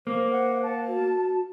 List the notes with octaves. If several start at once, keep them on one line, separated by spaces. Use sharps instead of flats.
A#3 C5
F#5
A5
F#4